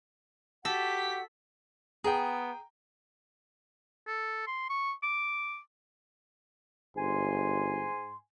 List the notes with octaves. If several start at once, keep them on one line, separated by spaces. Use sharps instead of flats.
F#4 G4 A4 F#5 B6
B3 G#4 G5 A#5
A4
C6
C#6
D6
G1 G#2 G#5 C6